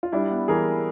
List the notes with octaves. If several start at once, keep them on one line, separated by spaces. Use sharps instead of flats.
F4
G3 D4 E4
B3
E3 G#4 A#4